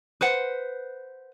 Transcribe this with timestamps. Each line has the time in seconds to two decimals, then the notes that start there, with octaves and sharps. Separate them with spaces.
0.21 B4 C5 F#5